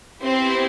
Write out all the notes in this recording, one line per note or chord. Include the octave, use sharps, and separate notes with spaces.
B3 C4 E4 G4 C5